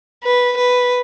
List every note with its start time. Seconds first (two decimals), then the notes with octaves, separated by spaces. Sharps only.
0.24 B4
0.57 B4